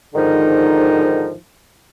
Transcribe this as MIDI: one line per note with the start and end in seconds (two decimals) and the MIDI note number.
0.14 1.33 44
0.14 1.33 50
0.14 1.33 51
0.14 1.33 53
0.14 1.33 63